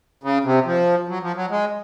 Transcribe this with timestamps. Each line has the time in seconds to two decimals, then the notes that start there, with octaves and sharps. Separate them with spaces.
0.24 C#3
0.45 C3
0.66 F3
1.09 F#3
1.22 F3
1.36 F#3
1.50 G#3